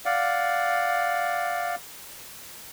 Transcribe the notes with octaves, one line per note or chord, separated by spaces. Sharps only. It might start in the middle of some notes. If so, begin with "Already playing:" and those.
D5 F5 F#5